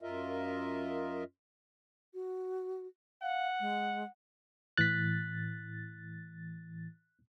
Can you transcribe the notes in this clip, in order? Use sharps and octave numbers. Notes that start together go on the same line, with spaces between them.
F#2 F4 A#4 D#5 E5
F#4
F5 F#5
G#3
A2 E3 F#6 A6 B6